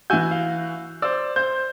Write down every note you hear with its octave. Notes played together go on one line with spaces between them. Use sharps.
E3 F#4 G#5 E6 G6
F5
C5 D5 E6
C5 G6